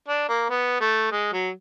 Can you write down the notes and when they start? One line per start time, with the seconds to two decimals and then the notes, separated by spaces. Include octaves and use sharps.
0.08 D4
0.29 A#3
0.50 B3
0.81 A3
1.12 G#3
1.33 F#3